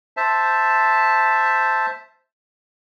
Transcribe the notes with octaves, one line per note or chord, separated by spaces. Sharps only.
C5 E5 A5